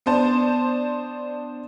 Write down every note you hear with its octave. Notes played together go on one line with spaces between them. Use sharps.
B3 D4 C5 A5